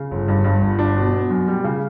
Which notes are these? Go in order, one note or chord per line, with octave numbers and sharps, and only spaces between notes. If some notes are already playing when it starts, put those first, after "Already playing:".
Already playing: C#3
G1
G2
G2
G1
D4
B2
B2
F#2
G3
C#3